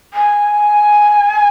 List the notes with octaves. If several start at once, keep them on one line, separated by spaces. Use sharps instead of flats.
G#5